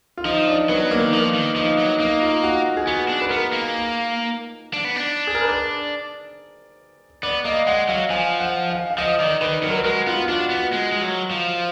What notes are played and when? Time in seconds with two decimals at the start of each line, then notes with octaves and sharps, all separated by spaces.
0.17 F4
0.25 F3 D#4
0.48 D4
0.69 F#3 B3
0.91 A#3
1.01 D#3
1.13 F3 A#3
1.34 D#3
1.56 F3 D#4
1.78 F#3
1.99 A#3 D#4
2.22 F4
2.43 F#4
2.77 G#4
2.87 B3 F#4
3.09 D4
3.21 B4
3.30 B3 A#4
3.53 A#3
4.73 D4
4.85 B3
4.96 D4
5.27 G#4
5.35 A#4
5.42 B4
5.48 D5
7.23 B3 D5
7.45 A#3 D#5
7.67 G#3 F#5
7.89 F#3 F5
8.10 F3 G#5
8.40 F#5
8.69 F5
8.91 F5
8.98 F3 D#5
9.20 D#3 D5
9.41 D#3 B4
9.63 F#3 A#4
9.70 B4
9.78 A#4
9.85 G#3 F#4
10.07 B3 F4
10.22 F4
10.29 D4 F#4
10.50 B3 F#4
10.72 G#3
10.92 G#3
11.02 F#3
11.31 F3